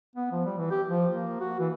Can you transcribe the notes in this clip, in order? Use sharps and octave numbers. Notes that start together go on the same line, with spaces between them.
B3
F3
G3
E3
G4
F3
A#3
F#4
E3